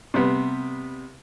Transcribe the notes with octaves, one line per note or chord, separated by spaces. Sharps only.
C3 G3 B3